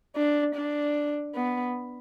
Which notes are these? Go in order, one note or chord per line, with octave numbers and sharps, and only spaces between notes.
D4
D4
B3